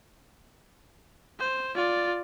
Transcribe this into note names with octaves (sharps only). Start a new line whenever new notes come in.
C5
F4 D5